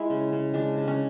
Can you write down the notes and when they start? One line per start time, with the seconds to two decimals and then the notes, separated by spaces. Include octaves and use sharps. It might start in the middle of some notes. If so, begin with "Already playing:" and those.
Already playing: G#3 E4
0.10 C#3
0.32 C#3
0.54 G#3 D4
0.77 C#3
0.87 C#4